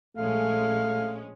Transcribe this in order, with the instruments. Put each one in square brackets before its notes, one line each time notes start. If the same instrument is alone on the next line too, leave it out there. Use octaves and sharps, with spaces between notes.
[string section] A#1 G#3 C#4 [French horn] A3 [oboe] F5